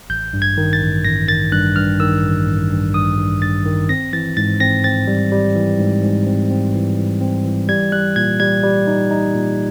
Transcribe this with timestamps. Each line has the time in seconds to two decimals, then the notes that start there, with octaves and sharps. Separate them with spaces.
0.10 A1 G6
0.33 G2
0.42 G#6
0.57 D#3
0.73 A6
0.81 A1
1.05 A1 A#6
1.28 D#3 A6
1.52 G2 F#6
1.76 G2 F6
2.00 D#3 E6
2.23 A1
2.47 A1
2.71 G2
2.94 G2 D#6
3.18 G2
3.42 G2 A6
3.66 D#3
3.89 C4 A#6
4.13 E3 A6
4.37 G#2 A6
4.60 C4 A#6
4.84 C4 A6
5.07 G3
5.32 G3
5.56 E3
5.79 G#2
6.03 G#2
6.27 C4
6.50 C4
6.74 E3
6.98 E3
7.21 C4
7.45 E3
7.69 G3 G#6
7.92 G3 F#6
8.16 A#2 G#6
8.40 G3 G#6
8.63 G3
8.87 D#4
9.11 D#4
9.35 A#2